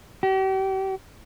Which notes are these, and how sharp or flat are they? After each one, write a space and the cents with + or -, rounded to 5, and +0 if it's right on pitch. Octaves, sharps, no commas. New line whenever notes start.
G4 -40